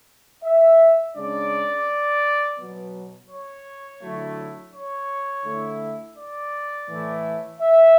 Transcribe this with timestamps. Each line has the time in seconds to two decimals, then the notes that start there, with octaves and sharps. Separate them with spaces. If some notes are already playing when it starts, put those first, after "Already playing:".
0.43 E5
1.15 C#3 G#3 D4 D5
2.58 B2 F#3 B3
3.30 C#5
4.02 D3 F#3 A3 E4
4.73 C#5
5.45 D3 A3 E4
6.17 D5
6.89 A2 E3 A3 E4
7.60 E5